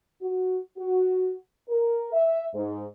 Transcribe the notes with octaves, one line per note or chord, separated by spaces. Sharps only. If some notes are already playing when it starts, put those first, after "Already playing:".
F#4
F#4
A#4
E5
G#2